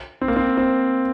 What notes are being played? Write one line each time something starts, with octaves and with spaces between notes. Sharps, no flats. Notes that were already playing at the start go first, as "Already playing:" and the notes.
C4
A#3
C4
C4